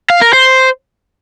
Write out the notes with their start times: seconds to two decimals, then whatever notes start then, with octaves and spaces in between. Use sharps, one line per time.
0.10 F5
0.21 A#4
0.33 C5